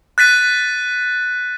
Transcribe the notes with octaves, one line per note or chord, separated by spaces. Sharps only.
F#6 A6 B6 D#7